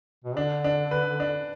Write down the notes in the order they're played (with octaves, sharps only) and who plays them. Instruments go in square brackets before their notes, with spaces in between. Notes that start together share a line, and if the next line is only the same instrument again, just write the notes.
[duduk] B2
[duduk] D3 [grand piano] D4
[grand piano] D4
B4
D4